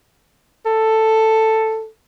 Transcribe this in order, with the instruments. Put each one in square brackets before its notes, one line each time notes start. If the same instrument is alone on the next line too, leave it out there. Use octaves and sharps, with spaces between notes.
[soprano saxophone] A4